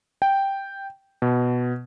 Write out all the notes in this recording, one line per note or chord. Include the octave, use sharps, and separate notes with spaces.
G5
B2